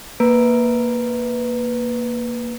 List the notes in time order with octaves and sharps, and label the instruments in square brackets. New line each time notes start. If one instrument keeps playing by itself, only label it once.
[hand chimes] A#3 B4 A#5 D7